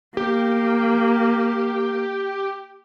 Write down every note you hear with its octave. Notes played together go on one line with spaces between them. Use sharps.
A#3 G4